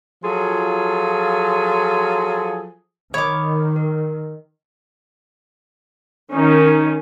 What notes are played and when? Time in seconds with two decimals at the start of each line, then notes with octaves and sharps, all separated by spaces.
0.24 F3 F#3 F4 G#4 A4
3.14 D#3 C#5 D#5 B5 D6 D#6
3.76 A#4
6.33 D#3 C#4 D#4